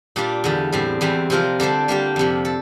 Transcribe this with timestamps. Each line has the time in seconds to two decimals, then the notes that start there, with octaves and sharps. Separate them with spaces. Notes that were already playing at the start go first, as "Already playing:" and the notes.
0.16 A#2 G3 D4 F4
0.44 E2 D3 G3
0.72 A2 G3 C4
1.01 E2 E3 G3 C4
1.30 C3 F3 C4 F4 A#4
1.60 D3 G3 D4 A4 C5
1.88 G3 A#3 D4 G4
2.16 F2 C3 F3
2.45 A4